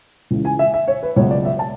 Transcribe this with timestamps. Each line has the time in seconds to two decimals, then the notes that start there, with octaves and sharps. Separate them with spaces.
0.31 C#2 C#3 E3
0.45 G#5
0.59 E5
0.74 E5
0.88 C#5
1.03 B4
1.16 C#2 B2 F#3 C#5
1.31 D5
1.45 E5
1.59 A5